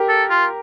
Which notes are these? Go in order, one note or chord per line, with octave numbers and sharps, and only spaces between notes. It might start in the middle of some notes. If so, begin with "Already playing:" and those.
Already playing: G4 A#4
A4
F4